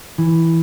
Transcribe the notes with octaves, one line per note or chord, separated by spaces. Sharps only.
E3